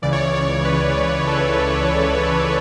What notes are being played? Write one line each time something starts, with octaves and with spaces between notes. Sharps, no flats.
C#2 C#3 E3 D5
C#5
D5
C#5
C#2 C#3 E3 B4
C#2 C#3 E3 A4
C#2 C#3 E3